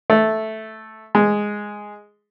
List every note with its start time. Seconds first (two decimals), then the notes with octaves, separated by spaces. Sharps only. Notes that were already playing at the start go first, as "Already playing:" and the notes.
0.10 A3
1.15 G#3